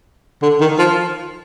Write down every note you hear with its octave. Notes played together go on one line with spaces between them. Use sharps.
D3
D#3
F3